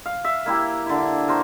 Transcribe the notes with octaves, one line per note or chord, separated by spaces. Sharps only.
F5
E5 F5
A#3 E4 G4
D3 E4
A#4 C5 C#6 D6